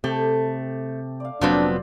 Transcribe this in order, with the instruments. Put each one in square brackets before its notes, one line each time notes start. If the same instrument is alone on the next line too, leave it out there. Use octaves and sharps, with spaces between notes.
[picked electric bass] C3 [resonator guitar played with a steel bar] A3 [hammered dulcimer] G4 A4
[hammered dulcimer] D5 F5
[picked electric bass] F1 F#3 [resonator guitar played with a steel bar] A#2 B3 C4 [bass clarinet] D4 [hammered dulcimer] F4 C5